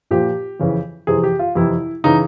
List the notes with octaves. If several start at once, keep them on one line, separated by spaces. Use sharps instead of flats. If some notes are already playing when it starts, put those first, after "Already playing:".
A#2 F3 G4
F2 C#3 E3
F2 C3 E3 G#4
G4
F4
F2 C3 E3 E4
C#3 E3 D#4